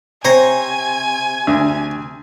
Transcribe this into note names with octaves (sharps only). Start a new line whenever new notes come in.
C3 C5 C#5 G#5 A#5
D2